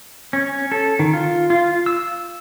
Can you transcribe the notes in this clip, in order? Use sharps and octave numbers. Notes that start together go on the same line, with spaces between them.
C#4
A4
D#3
F4
F4
E6